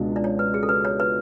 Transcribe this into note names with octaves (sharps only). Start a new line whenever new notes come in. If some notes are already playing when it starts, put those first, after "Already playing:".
Already playing: C#2 B2 G#3 D4 F4
D5
C#5
B4
G#4
A4
B4
C#5
B4